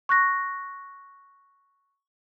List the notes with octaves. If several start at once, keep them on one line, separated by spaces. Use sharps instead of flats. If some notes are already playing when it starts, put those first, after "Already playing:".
C#6 F#6 A#6